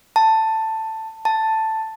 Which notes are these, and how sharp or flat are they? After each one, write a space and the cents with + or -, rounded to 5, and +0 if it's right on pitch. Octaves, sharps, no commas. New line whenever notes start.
A5 +10
A5 +5